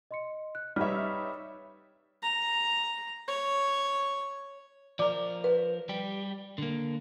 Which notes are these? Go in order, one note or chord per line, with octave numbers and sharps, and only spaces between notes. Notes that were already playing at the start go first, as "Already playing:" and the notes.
D#5 C6 C#7
F#6
G3 D#4 B4 C#5 E5 F6
E6 F6
A#5
C#5
F3 A#4 D5 D6
B4
G3 G4
D3 A#3